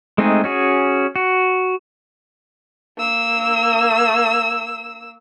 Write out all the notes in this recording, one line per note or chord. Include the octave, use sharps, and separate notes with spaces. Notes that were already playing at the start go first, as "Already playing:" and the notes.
G#3 A3 C4 D#4 G#4
C#4 F#4 G#4
F#4
A#3 E6